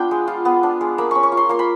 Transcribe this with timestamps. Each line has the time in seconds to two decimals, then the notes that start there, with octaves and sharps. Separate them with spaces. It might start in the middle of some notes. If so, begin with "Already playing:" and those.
Already playing: B3 D4 F4 G5
0.11 G#3
0.28 F4
0.45 B3
0.63 D4
0.81 G#3
0.98 A#3 B5
1.11 C#4 C#6
1.23 C#6
1.32 F4
1.37 C6
1.49 A#3 C6
1.59 B5